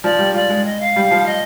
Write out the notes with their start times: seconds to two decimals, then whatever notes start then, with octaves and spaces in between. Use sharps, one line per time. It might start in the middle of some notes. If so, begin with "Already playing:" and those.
0.03 F3 D5
0.19 G3
0.34 F4 D5
0.50 G#3
0.65 D#5
0.80 F5
0.96 G3
1.11 F3
1.26 D#5